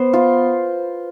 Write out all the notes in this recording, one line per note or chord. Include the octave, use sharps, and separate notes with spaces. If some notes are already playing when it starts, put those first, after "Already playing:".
Already playing: B3 C5
F4